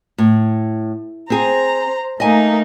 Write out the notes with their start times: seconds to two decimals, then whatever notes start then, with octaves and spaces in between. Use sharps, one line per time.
0.18 A2
1.30 C4 G#4 C5 A#5
2.20 A3 A#3 D#4 D#5 G#5